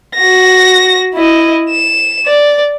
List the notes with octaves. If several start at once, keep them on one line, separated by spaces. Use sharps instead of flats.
F#4 A#6
E4 D#5
E7
D5